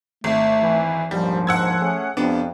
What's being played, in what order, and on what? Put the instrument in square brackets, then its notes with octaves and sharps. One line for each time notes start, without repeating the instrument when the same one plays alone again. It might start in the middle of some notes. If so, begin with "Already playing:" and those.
[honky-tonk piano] G#1 [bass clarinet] A3
[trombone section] E3
[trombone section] A#1 D#2 G#2 [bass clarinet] F3 [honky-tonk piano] G3
[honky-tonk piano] F#5 E6 G#6
[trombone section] A3 C#4 G#4
[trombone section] F2 C3 [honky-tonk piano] B3 D4